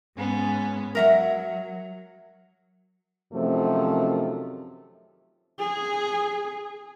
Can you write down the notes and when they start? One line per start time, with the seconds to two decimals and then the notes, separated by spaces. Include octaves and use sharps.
0.16 G#2 B3 C#4
0.95 F#3 A#4 E5 F#5
3.33 F#2 C3 D#3 F3 A3
5.59 G#4